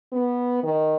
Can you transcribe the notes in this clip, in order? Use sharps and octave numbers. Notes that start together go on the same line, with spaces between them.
B3
D#3